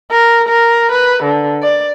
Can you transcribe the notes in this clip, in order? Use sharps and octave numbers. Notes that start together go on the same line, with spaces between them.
A#4
A#4
B4
D3
D5